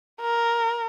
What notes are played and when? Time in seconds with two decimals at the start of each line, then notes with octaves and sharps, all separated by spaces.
0.21 A#4